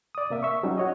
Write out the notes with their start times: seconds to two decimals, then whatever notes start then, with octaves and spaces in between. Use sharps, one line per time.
0.15 D5 D#6
0.30 C3 A#3 E5
0.43 E5 C#6
0.63 F#3 G3 C#4 D#4
0.78 F#4 C#5 D#5